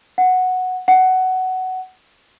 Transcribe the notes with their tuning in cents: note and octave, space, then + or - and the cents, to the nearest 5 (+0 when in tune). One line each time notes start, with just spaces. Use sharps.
F#5 -5
F#5 +15